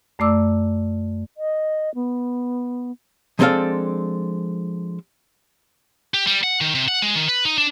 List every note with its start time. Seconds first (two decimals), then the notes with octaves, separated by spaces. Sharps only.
0.19 F#2 A3 D5 D6 E6
1.37 D#5
1.95 B3
3.39 F3 G#3 C4 D4 A4 F5
6.14 G4
6.27 G3
6.44 F#5
6.61 D#3
6.75 C3
6.88 F#5
7.02 G#3
7.15 D#3
7.28 B4
7.45 D#4
7.58 D4